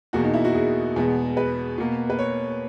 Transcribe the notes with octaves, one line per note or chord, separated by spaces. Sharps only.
E2 B2 A#3 F#4
D#4
E4
F#4
G#4
E2 B2 G#3 B3
B4
B2 A#3
B4
C#5